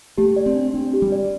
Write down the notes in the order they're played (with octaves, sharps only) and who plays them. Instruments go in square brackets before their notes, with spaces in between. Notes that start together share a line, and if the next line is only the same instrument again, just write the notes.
[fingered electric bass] A3 [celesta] G4
[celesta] D5
[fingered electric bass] C4
[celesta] D4
[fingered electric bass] C4 [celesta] D4
[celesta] G4
[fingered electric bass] G3
[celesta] D5